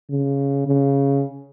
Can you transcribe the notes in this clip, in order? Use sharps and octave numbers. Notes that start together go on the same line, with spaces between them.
C#3
C#3